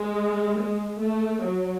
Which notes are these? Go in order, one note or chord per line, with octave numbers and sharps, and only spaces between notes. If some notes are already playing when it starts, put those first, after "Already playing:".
Already playing: G#3
G#3
A3
F#3